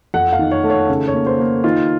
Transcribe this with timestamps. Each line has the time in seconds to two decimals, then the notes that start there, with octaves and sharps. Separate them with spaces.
0.14 F2 F#5
0.33 F5
0.39 D#3
0.51 C#5
0.64 A3
0.70 C#5
0.89 C#3
1.08 C#5
1.14 A#3
1.26 C5
1.39 A#3
1.64 D#3 F4